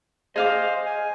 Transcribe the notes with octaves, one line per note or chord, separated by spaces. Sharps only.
G#4 C5 D#5 F5 D6
G#5